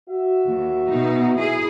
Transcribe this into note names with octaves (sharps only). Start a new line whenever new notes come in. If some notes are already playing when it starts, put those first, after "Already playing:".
F#4 E5
D#2
B2 D#4
E4 G#4